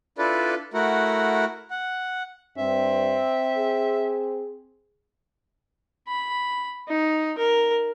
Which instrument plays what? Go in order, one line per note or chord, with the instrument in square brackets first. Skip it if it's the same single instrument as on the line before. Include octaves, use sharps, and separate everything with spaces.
[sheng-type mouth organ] D4 E4 F4 A4 B4 D5
A3 E4 F#4 A#4 F#5
F#5
[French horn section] G2 D4 [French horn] C4 [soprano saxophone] E5
[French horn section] G#4
[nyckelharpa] B5
D#4
A#4